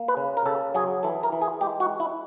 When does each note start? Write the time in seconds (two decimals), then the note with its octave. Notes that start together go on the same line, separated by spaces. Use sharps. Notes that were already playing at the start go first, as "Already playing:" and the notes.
Already playing: A#3
0.08 B4
0.17 C#3
0.37 A#4
0.46 C#3 A4
0.74 F#3 G#4
1.03 E3 A4
1.23 A#4
1.32 E3
1.42 G#4
1.61 G#3 G4
1.80 F#4
1.89 G#3
2.00 E4